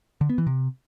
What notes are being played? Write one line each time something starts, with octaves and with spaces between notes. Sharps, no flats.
D3
B3
E3
C3